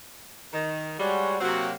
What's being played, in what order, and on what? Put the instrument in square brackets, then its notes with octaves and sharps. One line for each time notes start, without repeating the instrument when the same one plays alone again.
[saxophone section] D#3
[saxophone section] G3 [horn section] G#3 F#4 C#5
[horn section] C3 F#3 A#3 [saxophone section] C4 F#4